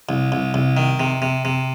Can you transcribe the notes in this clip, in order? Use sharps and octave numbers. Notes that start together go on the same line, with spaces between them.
C2
C2
C2
D#3
C3
C3
C3